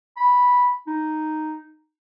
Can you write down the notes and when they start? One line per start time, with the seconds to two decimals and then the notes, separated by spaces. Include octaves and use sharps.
0.17 B5
0.87 D#4